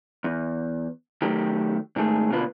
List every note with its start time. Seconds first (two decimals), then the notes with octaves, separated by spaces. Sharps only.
0.24 E2
1.22 D#3 F#3 A3 G4
1.96 G#2 D#3 A3 G#4
2.30 B2 D3 A#3 F4 B4